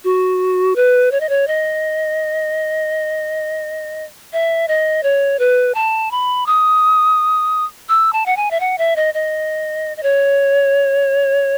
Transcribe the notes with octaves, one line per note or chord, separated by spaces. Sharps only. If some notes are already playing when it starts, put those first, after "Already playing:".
F#4
B4
C#5
D#5
C#5
D#5
E5
D#5
C#5
B4
A5
B5
D#6
E6
A5
F#5
G#5
E5
F#5
E5
D#5
D#5
D#5
C#5